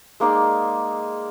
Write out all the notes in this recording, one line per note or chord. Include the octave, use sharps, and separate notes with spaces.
G#3 A#3 D#4 D5